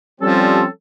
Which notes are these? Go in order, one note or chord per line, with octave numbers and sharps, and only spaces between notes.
F3 G3 C4 C#4 A4